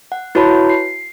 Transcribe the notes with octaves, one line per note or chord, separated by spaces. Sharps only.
F#5
E4 F#4 B4 C#5 A5 B5
C7